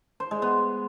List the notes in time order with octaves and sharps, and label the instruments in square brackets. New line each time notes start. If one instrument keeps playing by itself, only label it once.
[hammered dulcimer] C5
G#3
B3